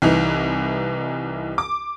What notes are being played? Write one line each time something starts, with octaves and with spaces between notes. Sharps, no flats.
C2 E3 D#4
D6